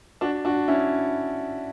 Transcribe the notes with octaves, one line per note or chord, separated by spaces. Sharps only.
D4 F#4
D4 F#4
C#4 E4